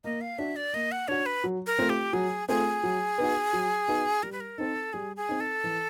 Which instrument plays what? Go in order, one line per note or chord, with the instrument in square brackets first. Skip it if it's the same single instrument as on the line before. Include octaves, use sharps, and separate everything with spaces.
[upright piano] A#3 [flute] D#5
[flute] F5
[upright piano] D4 F#4 [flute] E5
[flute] D5
[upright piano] A#3 [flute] D#5
[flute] F#5
[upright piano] D4 F#4 [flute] C#5
[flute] B4
[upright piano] F#3
[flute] A#4
[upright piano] A3 C4 F4 A4
[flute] G4
[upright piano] F#3 [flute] G#4
[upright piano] A3 C4 F4 A4 [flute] G#4
[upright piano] F#3
B3 D#4 F#4
F#3
B3 D#4 F#4
[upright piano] G3 [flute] A#4
[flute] B4
A#4
[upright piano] C4 D#4 [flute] A4
[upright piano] G3 [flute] G#4
[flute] G#4
[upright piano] C4 D#4
[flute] A4
[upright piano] E3